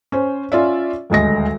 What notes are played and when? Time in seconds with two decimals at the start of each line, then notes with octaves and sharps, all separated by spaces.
0.12 C#4 C5
0.52 C#4 F4 D5 E5
1.10 D#1 D2 G#3 A#6